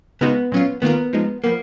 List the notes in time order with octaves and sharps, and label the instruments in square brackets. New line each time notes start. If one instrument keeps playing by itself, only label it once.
[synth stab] C#3 G#3 D#4 F#4 [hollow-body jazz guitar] B3
[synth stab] A#2 F#3 C#4 F4
[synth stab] D#3 A#3 F4 A#4 [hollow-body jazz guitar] B3
[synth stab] F3 G#3 D#4
[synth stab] F3 B3 [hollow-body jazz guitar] A#3